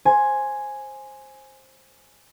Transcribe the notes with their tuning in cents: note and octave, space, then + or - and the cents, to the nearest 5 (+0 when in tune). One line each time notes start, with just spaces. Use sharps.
C5 +15 G#5 +0